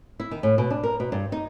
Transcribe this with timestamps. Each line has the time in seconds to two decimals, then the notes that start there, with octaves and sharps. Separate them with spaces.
0.20 E4
0.31 D#3
0.43 A2
0.58 B2
0.71 D4
0.83 A#4
1.00 B2
1.12 G2
1.32 D#4